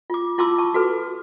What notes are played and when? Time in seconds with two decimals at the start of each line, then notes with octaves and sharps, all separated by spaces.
0.10 F4 D6
0.38 E4 F4 A5 C6 D6 E6
0.58 A5 C#6
0.74 F#4 A4 B4